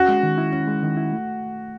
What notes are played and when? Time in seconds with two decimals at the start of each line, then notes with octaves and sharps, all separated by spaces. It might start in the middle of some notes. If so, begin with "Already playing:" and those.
Already playing: C#4 F#4
0.08 G#3
0.23 D#3
0.38 E4
0.52 C#4
0.68 G#3
0.83 D#3
0.97 E4
1.12 A3